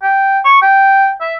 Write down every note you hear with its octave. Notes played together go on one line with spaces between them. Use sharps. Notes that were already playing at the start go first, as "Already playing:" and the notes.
G5
C#6
G5
E5